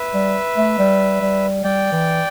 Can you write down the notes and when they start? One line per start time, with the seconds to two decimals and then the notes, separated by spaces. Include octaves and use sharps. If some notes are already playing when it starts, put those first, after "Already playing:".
Already playing: B4 E5
0.14 G3
0.57 A3
0.78 G3
1.22 G3
1.63 G3 D5 G5
1.92 E3